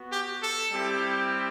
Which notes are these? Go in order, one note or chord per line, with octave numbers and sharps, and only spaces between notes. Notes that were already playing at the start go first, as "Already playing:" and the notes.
Already playing: B3 F#4
G4
A4
G3 C4 E4 G4